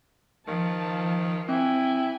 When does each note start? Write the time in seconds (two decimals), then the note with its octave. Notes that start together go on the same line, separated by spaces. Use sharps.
0.48 D#3 F3 A5
1.49 C4 E4 G5 G#5